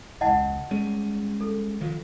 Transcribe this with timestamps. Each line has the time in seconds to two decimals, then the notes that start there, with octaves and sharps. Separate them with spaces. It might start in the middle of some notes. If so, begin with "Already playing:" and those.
0.21 E1 C#2 D#5 F#5 A5
0.71 G3 G#3 C#4
1.41 A4
1.81 D#3 F3 F#3